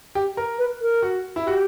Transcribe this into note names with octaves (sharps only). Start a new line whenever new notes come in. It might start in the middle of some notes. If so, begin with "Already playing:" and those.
G4
A#4
B4
A#4
F#4
E4
F#4 G4